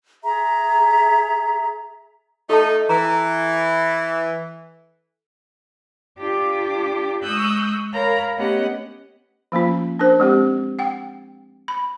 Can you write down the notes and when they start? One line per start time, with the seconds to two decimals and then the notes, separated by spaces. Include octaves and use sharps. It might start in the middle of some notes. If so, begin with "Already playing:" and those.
0.24 G#4 E5 A#5
2.50 A3 D#4 A4 A5
2.89 E3 A#5
6.19 D4 F4 G4 D6
7.23 G#3 C#6 D#6 E6 F#6 G6
7.93 A#4 C#5 F5 A#5 B5
8.35 A3 B3 C#4 G4 D#5 F#5
9.52 F3 A#3 C#4 F4
9.99 D4 A#4 C5
10.20 G#3 C4 G4
10.79 F#5 G5
11.68 B5